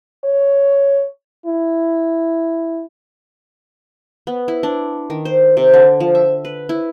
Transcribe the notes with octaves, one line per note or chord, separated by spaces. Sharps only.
C#5
E4
B3
E4
D4
D#3
C5
C3
D3
F3
E5
B4
E4